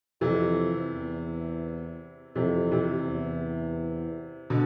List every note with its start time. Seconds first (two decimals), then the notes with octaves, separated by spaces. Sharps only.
0.21 F2 C3 E3
0.92 E2
2.36 F2 C3 E3
2.72 C3 E3
3.07 E2
4.50 B2 D3